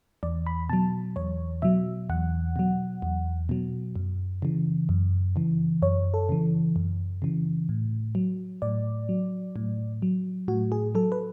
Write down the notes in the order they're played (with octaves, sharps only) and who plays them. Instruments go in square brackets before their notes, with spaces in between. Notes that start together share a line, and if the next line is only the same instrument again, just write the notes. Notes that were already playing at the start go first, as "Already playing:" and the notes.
[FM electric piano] E2 D5
B5
B2 F#3 A5
E2 C#5
B2 F#3 E5
E2 F#5
B2 F#3
E2
B2 F#3
F#2
C#3 E3
F#2
C#3 E3
F#2 C#5
A4
C#3 E3
F#2
C#3 E3
A2
F#3
A2 D5
F#3
A2
F#3
A2 F#4
G#4
F#3 A4
B4